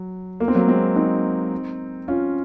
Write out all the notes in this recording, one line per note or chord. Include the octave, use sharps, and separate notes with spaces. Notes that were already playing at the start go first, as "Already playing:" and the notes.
Already playing: F#3
A#3
C4
F#3 A#3
G#3 C4
C4 D#4
C#4 F4